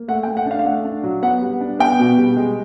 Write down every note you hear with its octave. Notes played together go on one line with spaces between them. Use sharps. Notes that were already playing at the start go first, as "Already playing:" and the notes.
Already playing: A#3
A3 F#5
G5
A3
F#5
D4 F5
F5
A3 F#5
D4
F#3
B3 F#5
G3
D4
B3 G5
B2
G3
G#3